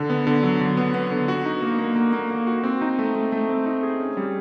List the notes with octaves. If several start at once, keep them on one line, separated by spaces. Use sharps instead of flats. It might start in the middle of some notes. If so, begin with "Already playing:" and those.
Already playing: D3
B3
D3
F#3
D3
B3
B3
D3
F#4
D#4
A#3
A#3
A#3
A#3
A#3
F#4
C4
D#4
A3
A3
A3
C4
D#4
G#4
C#4
G3